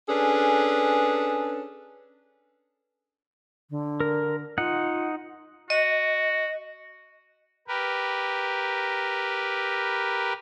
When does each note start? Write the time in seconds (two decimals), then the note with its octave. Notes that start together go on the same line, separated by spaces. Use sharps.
0.09 C#4 D4 G#4 A4 B4
3.70 D3
4.00 A#4
4.58 D#4 F4 F#5
5.70 F#4 D#5
7.68 G4 A#4 B4